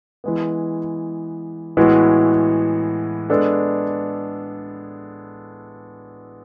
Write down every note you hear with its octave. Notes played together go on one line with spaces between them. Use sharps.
E3 G#3 B3
A2 E3 G#3 B3 F#4
G#3 B3 D4 A4 D5